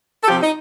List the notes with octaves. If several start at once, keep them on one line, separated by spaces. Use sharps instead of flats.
A4
C3 F3 G4
D#4